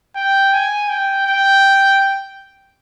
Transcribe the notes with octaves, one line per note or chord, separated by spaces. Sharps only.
G5
G#5
G5
G5